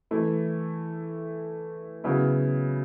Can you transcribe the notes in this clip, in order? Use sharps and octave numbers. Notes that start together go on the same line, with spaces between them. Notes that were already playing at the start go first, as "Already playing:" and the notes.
E3 A3 E4
C#3 F#3 B3 E4